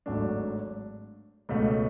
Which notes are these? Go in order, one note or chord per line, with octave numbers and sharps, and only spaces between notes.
G#1 G#2 F#3 A3 D4
C#2 B2 A3